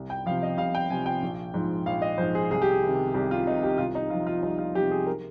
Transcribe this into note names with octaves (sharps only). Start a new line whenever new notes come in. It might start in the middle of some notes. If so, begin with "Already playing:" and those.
Already playing: C2
G5
C3 F3 F5
D#5
C2 F5
G5
C3 F3 G#5
G5
A#1
G#2 F3
A#1 F5
D#5
G#2 F3 C5
G#4
C2 G#4
G4
G#4
C3 D#3
C2 G4
F4
C3 D#3 D#4
G4
C2 F4
D#4
C3 F3 F4
F4
C2 D#4
F4
C3 F3 G4
G#4
A#4